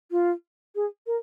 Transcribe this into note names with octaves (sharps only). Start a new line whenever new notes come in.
F4
G#4
A#4